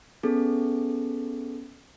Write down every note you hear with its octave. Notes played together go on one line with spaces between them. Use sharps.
B3 C#4 G#4 A4